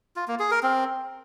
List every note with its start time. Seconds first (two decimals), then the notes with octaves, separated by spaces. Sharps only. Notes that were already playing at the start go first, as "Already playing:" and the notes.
0.16 F4
0.28 A#3
0.39 G#4
0.51 A#4
0.63 C4